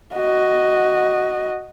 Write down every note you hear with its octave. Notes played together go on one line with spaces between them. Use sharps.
F#4 D#5